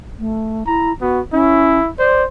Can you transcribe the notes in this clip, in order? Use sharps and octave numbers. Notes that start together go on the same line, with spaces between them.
A3
E4 A#5
B3 F#4
C#4 E4
C5 D5